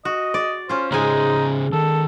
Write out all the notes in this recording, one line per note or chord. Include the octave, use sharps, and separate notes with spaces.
F#4 D#5
D5
C#4 F4 C5
C#3 G#3 C#4 D#4 C5 G#5
D#3 A4